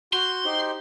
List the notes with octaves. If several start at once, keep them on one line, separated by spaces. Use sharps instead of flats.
F#4 C6 G6
D#4 G4 C5